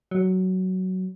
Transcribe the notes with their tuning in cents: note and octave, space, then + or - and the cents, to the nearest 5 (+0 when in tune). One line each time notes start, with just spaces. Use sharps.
F#3 +10